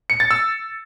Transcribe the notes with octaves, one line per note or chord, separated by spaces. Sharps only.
C#7
A6
E6